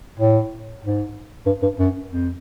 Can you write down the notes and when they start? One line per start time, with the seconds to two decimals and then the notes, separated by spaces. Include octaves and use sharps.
0.19 A2
0.84 G#2
1.46 G2
1.62 G2
1.79 F#2
2.10 F2